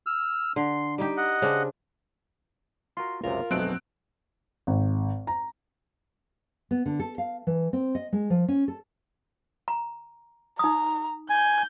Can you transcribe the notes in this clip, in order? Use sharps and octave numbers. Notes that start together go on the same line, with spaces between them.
E6 F6
D3 C6
G3 D#4 G4
D#5 F#5
C#3 C4 D4
F4 F#4 A#4 C6
C#2 F#2 C3 F4 A#4
B1 F2 F#3 G#3 A3 C4 F#6 D7
G#1
A#5
B3
D3
A4
F5
E3
C4
D#5
G#3
F3
C#4
A4
A#5
D#4 A#5 D#6
G#5 G6